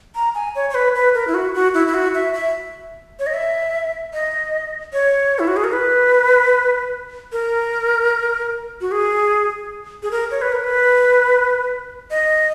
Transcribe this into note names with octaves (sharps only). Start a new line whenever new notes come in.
A#5
G#5
C#5
C#5
B4
B4
A#4
E4
F#4
F#4
E4
E4
F#4
E5
E5
C#5
D#5
E5
D#5
C#5
E4
F#4
G#4
A#4
B4
A#4
F#4
G#4
G#4
A#4
C#5
B4
A#4
B4
D#5